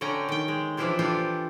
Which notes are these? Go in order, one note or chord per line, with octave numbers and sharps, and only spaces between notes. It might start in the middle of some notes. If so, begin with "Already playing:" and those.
D3 C#4 G5 A#5
D#3 G5
G#3
E3 F3 D4 E4 F4 G4
E3 D4 F4 G4 A4 D5